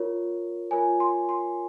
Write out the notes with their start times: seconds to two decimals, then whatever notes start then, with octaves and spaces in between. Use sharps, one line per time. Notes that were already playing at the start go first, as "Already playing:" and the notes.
Already playing: F4 A#4 C#5
0.71 F4 A#4 C#5 G#5
1.00 C6
1.29 C6